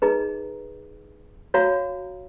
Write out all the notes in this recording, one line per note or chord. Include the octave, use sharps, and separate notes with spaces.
D#4 G#4 B4 D#5 A#5
F#4 C#5 F5 A#5